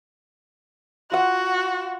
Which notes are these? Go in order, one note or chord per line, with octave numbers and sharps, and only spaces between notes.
F4 F#4 F#5